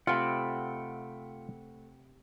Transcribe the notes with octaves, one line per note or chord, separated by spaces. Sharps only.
C3 A3 F4 F#5 G5 B5